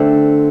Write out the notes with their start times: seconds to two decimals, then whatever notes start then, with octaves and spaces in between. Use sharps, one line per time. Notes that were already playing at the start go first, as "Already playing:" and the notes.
Already playing: D3 A3 C4